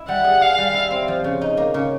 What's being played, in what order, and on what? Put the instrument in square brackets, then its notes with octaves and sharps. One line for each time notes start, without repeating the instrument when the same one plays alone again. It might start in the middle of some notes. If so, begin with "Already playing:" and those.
Already playing: [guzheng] E4
[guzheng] G3 [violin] F#5
[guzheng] G#4
[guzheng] G#4 [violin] F5
[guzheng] G3
E4
C4
F3
C#3
D#4
A#3
C#3